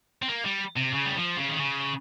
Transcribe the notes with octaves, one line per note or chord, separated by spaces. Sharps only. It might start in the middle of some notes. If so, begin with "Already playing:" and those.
C4
A#3
G3
C3
C#3
G3
F3
C#3
D#3
C#3